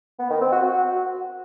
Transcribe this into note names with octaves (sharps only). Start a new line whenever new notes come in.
B3
D#3
C4
F#4
F#4